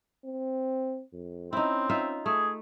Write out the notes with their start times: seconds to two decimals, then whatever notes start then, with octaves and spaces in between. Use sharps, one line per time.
0.25 C4
1.13 F2
1.53 C4 C#4 D#4 E4
1.89 D#4 F4 E5
2.26 A3 G#4